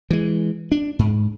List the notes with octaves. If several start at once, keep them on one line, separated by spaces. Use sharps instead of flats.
E3 G#3
D4
G#2